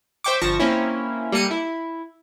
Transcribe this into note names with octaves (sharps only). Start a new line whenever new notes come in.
C5 E5 G5 C#6 D6
G1 F3 A5 C#6 A#6
A#3 C4 C#4 E4
G3 A#3 A4 C#7 D#7
E4